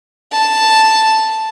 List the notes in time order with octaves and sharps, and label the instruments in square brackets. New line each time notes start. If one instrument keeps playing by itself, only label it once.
[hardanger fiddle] A5